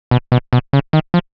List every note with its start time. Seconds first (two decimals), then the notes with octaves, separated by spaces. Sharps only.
0.11 B2
0.32 B2
0.53 B2
0.73 C#3
0.93 D#3
1.14 F3